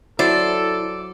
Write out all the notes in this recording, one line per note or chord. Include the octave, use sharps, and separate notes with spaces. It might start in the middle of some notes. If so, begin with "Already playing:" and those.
F#3 E4 A4 C5 D5